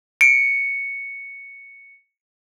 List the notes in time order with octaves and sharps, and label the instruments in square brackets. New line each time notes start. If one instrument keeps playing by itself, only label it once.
[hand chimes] C#7 [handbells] D7